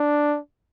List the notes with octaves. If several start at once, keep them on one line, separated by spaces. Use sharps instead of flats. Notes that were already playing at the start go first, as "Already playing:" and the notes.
Already playing: D4